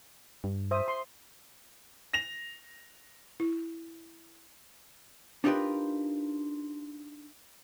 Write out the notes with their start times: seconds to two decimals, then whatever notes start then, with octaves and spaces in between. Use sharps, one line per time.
0.44 G2
0.71 C5 E5 D#6
0.88 C6
2.13 A#6 F7
3.40 E4
5.44 D4 D#4 F4 G4 A#4 B4